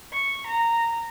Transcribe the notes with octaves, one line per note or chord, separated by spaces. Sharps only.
C#6
A#5